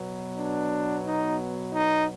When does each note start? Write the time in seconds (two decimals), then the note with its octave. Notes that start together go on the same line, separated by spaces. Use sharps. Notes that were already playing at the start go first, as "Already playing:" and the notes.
Already playing: B2 F#3 B3
0.38 D4
1.06 D#4
1.74 D#4